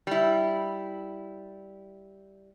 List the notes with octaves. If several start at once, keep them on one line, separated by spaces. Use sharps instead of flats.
G3 E4